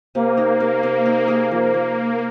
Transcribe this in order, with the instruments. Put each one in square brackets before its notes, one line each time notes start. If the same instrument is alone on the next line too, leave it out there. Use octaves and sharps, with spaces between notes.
[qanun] C3 [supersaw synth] A#3
[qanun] D#4
C3
C3
D#4
G#4
[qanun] F3 [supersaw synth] A#3
[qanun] F3